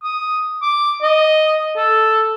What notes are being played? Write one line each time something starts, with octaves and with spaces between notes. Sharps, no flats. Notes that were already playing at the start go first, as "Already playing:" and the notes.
D#6
D6
D#5
A4